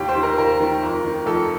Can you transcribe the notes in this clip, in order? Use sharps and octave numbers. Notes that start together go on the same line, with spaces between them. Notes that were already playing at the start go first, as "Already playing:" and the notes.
Already playing: D#2 G4
C5
D#3
A#4
D#2 A#4
D#3
F2
D#3
F2 A4